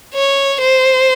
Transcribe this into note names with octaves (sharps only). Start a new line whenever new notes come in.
C#5
C5